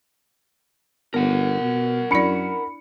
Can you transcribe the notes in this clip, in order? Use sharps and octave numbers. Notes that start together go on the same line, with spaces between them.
G1 B3 A#4 F#5
B2
F#2 D4 E4 D5 B5 C#7